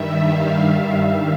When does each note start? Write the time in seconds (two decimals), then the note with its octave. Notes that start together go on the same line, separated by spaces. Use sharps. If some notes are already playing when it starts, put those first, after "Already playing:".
Already playing: G2 D#3 G3 E5
0.27 F5